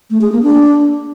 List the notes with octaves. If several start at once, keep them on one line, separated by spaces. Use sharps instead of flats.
A3
G#4
A#3
D4